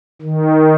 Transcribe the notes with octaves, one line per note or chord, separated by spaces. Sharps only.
D#3